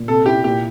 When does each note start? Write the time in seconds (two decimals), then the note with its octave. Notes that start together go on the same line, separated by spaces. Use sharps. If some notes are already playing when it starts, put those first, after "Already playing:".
Already playing: A#2
0.08 C3 A4
0.26 E4 G4
0.44 A#2 G4